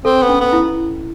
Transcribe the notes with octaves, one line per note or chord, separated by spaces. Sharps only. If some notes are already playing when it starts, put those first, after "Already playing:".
C4 A4
B3
C#4
B3
E4